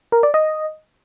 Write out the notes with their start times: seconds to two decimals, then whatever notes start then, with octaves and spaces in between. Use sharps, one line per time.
0.12 A#4
0.23 D5
0.34 D#5